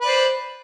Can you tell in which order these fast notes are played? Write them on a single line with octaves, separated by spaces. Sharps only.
B4 D5 C5